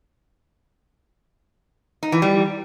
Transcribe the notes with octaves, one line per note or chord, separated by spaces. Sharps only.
D#4
E3
G3